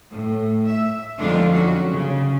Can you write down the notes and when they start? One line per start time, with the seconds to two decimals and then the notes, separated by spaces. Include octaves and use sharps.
0.13 A2
0.68 E5
1.18 F2 D3 G#3 D4 D#4 F4
1.52 F#3 C#4 F#4
1.91 C#3